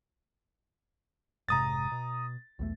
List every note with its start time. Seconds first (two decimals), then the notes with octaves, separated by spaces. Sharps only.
1.49 F1 G#2 C3 A#5 D#6 A6
1.92 B2
2.59 B1 E2 A3